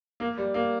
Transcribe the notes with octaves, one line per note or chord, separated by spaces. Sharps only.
A#3
G3
A#3